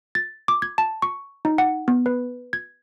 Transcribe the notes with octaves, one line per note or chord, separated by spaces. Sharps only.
A6
D6
G#6
A5
C#6
D#4
F#5
B3
B4
G#6